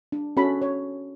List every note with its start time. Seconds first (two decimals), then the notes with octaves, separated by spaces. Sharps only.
0.12 D4
0.37 C#4 F#4 A4 B5
0.62 C#5